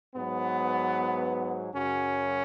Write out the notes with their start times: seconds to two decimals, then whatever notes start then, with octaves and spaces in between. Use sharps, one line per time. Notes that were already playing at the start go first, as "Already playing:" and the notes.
0.15 G#2 F#3 B3
1.74 F#2 C#3 F#3 C#4